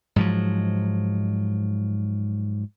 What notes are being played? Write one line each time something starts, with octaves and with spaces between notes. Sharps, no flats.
G#2 F3 F#3